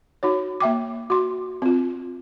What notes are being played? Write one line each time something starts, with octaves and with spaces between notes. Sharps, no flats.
D#4 F#4 C#5
A#3 E5 G5 D6
F#4 C6
C4 F4